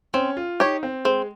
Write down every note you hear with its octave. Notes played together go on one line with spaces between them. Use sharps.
C4 C#4
F4
D#4 G4 C#5
C4
G#3 C4